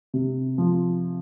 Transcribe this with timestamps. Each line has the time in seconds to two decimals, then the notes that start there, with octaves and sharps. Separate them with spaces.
0.14 C3
0.58 F3